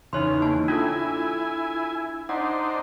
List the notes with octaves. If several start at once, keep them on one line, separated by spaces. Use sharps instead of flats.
E2 C#3 D#4 C#5 C6
A#3 A5
D4 E4 F4 A4 G#5
D4 D#4 C5 F#5